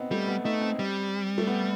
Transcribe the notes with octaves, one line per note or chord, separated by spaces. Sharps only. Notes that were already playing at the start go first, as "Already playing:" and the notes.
Already playing: B3 C4 D#4
G3 A3
B3
A3 D#4
C4
G3
A3
B3